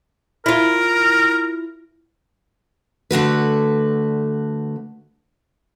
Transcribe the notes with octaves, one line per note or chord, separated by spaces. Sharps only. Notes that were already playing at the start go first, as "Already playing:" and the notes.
E4 F4 A#4
D3 A3 F#4 B4